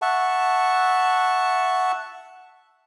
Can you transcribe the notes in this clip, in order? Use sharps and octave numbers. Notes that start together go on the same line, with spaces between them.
E5 F#5 A5 C#6